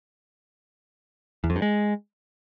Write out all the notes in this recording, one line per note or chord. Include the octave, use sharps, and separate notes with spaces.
E2
F2
G2
G#3